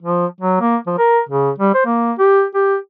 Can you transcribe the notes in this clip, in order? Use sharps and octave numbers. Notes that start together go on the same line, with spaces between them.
F3
F#3
A#3
F3
A#4
C#3
G3
C5
A#3
G4
G4